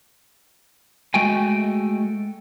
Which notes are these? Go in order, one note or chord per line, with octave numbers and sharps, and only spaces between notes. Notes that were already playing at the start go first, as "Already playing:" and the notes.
G#3 A3 F#4 G5 G#5